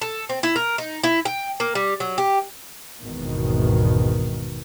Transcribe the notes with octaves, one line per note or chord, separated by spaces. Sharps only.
A4
C4
E4
A#4
D#4
E4
G5
A#3
G3
F#3
G4
G#1 E2 B2 D#3